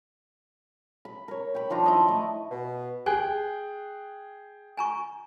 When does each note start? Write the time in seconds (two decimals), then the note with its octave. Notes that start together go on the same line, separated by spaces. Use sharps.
1.05 B5
1.28 A#4 C#5
1.55 G5 B5
1.70 D#3 F3 D4 A#5
1.84 E4 D#5 G#5
2.08 A3
2.51 B2
3.06 G#4 G5 G#5 F#6
4.77 G#5 A#5 C#6